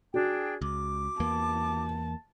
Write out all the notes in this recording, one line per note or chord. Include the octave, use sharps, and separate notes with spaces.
D4 F#4 G#4 G5
C#2 D6
E2 E3 A#3 A5